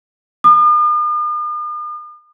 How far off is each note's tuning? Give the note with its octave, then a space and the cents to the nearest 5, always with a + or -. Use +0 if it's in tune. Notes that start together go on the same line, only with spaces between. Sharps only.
D#6 -45